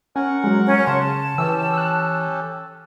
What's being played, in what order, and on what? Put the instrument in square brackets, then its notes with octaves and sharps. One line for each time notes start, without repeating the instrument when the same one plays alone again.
[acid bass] C#4 [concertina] A#4 F#5 C#6 [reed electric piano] G#5
[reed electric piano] F#3 G#3
[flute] C#4
[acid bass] C#3 [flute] A5 [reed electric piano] C6
[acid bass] E3 [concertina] C#4 G4 A4 [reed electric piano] E6
[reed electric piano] E6 F#6